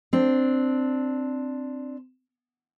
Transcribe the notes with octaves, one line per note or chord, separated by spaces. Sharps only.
C4 D4